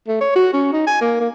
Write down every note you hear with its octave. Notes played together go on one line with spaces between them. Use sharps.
A3
C#5
F#4
C#4
D#4
G#5
A#3
A#3